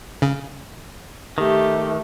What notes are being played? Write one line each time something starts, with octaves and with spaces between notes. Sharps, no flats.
C#3
D#3 A3 G4